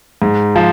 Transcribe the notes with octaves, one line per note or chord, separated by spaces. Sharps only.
G#2
F3